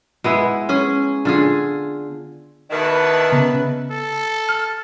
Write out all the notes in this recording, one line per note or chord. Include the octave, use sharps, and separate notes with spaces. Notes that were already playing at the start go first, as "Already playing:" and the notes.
G#3 B3 E4
C#4 G#4
D3 F4 G#4
E2 B2 D#3 B4 E5 A5
C#3 B3
A4
F6